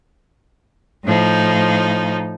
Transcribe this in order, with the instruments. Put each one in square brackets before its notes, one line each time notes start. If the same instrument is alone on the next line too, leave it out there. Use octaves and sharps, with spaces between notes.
[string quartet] A2 F3 D#4